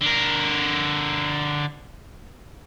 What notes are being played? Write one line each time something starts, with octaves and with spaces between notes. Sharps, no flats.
D3 A#4